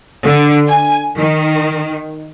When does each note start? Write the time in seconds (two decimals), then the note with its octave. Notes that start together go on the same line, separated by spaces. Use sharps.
0.24 D3
0.69 G#5
1.16 D#3